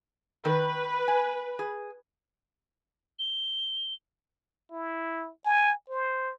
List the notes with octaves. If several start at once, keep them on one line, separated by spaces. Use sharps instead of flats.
D#3 B4
G#5
G#4
G7
E4
G#5
C5